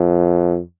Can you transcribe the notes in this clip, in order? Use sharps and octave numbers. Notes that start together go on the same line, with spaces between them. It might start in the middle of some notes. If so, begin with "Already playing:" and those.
Already playing: F2